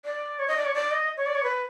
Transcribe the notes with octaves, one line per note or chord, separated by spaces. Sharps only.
D5
C#5
D#5
D5
C#5
D5
D#5
C#5
D5
C#5
B4